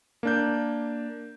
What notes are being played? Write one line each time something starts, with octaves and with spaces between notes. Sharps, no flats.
A#3 D4 G6